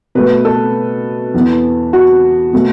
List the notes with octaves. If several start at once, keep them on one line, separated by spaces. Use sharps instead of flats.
B2 A3 B4
A4
E2 E3 B3
F#4
B2 A3